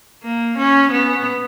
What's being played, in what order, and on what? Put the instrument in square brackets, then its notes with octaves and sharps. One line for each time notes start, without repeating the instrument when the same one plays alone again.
[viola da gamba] A#3
C#4
B3